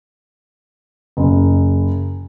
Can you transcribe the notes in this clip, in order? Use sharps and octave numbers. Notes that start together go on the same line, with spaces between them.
F#1